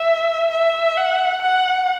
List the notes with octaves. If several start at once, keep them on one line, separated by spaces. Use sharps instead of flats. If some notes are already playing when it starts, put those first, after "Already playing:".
Already playing: E5
E5
F#5
F#5